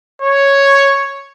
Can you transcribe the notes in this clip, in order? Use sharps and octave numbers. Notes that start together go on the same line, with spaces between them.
C#5